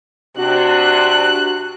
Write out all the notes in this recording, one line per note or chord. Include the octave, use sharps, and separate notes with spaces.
C3 D4 F#4 F#6